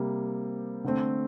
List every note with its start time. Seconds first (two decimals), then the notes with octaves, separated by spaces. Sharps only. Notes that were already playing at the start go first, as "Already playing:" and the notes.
Already playing: C3 G3 A#3
0.84 D3 A3 C4